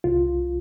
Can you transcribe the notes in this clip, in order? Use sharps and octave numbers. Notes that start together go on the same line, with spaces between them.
C2 F4